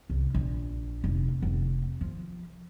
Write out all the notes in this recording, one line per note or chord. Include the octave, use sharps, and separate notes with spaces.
C2
A#1
F1
F1
F3